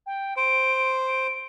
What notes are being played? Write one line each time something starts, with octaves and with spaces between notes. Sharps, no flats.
G5
C5 D7
D7